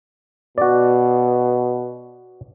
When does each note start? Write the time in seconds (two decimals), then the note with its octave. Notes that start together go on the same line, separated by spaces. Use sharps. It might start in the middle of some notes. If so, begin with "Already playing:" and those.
0.58 B2 F#4 D5